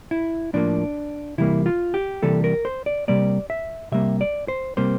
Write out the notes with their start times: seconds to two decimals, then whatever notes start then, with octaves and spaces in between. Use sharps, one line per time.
0.11 E4
0.53 A2 F3 A#3 D4
1.38 C3 E3 G3 A#3 E4
1.66 F4
1.94 G4
2.22 C3 E3 G3 A#3 A4
2.44 A#4
2.65 C5
2.86 D5
3.08 C3 G3 A#3 D5
3.50 E5
3.92 C3 G3 A#3 E5
4.21 D5
4.48 C5
4.77 C3 G3 A#3 C5